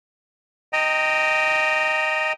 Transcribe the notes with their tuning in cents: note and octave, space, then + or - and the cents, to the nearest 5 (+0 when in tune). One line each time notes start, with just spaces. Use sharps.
D#5 +0 G5 +0 A#5 -20